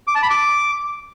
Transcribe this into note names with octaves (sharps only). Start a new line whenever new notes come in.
D6
A5
B5
D6